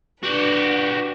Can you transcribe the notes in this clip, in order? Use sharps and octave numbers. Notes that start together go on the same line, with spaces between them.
D4 F#4 G4 B4